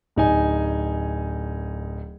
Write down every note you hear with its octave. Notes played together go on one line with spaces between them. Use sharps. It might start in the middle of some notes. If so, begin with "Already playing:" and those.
D1 D#4 G#5